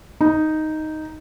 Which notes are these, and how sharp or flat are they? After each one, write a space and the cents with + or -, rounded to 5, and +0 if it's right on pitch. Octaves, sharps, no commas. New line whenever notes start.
D#4 +0